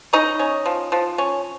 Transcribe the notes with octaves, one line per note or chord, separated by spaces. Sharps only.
C#4 D#4 D#5
C#4
F3
F3
C#4